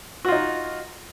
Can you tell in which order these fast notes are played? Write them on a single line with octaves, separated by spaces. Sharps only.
F#4 F4 D#4